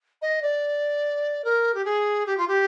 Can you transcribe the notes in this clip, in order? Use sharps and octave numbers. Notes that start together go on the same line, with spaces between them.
D#5
D5
A#4
G4
G#4
G4
F4
G4